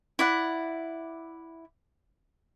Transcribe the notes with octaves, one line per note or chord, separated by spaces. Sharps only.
E4 D5 F#5